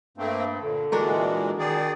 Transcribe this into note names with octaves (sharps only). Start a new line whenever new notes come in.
G2 A3 A#3 C4
A#2 D3
A#2 E3 G#3 D4 F#4 A#4
D#3 G#4 D5